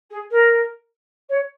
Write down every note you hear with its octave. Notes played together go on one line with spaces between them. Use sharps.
G#4
A#4
C#5